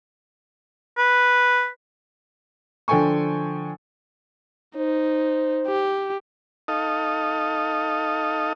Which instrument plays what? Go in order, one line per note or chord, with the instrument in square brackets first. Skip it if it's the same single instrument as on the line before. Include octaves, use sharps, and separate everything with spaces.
[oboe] B4
[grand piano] D3 F3 A4 G5 G#5 C#6
[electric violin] D#4 [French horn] C5
[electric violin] G4
[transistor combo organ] D#4 A4 D#5 F5